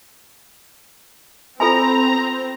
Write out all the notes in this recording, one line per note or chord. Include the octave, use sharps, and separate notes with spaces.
C4 F4 A4 G#5 A#5